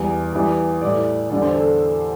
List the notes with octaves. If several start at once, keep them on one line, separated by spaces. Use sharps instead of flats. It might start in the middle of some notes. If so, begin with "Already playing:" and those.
Already playing: E2 E3 G3
E2 E3 G3
A2 G3 D5
E2 D3 G3 D5
C5
A4